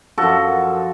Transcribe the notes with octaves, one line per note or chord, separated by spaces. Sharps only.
F#2 F3 F#4 A4